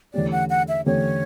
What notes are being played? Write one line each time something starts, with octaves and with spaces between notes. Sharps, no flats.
E2 D3 A3 C#4 G4 D5
F#5
F#5
E5
E2 D3 A3 C#4 G4 C#5